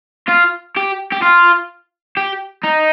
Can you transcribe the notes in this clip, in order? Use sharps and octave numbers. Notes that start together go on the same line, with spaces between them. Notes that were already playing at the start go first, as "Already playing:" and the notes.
F4
G4
G4
F4
G4
D#4